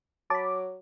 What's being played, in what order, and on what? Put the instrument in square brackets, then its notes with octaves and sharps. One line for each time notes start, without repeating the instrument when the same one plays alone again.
[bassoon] F#3 [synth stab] A5 B5 [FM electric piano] D6